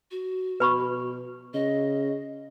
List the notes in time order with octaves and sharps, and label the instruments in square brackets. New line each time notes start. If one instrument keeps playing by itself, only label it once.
[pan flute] F#4
[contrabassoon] B2 [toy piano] B4 B5 C#6
[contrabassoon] C#3 [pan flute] D#5